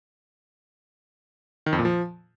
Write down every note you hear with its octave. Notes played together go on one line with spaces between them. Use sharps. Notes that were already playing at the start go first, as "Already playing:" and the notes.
D#3
F2
A#2
F3